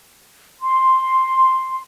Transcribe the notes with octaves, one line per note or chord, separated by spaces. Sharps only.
C6